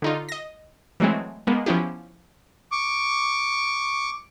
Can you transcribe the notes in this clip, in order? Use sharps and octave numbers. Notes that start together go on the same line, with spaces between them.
D3 D#4 F4
D#5 A#6
E3 F#3 G#3 A3 C4
G#3 A#3 B3
F3 B3 C#4 E4 G4
C#6 D6